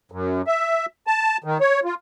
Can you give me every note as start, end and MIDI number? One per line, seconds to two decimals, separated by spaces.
0.12 0.42 42
0.47 0.86 76
1.07 1.37 81
1.44 1.58 51
1.61 1.80 73
1.85 1.94 65